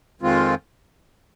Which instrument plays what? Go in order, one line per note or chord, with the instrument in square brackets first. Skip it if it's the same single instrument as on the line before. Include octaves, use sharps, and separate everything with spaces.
[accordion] F2 D#3 G#3 C4 F4